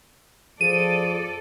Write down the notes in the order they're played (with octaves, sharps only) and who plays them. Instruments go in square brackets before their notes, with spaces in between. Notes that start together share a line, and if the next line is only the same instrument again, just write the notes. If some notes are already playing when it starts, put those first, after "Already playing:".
[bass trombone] F3 [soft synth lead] G#4 [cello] A4 D5 [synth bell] D#7